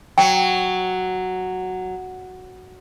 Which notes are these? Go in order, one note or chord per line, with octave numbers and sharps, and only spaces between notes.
F#3 G5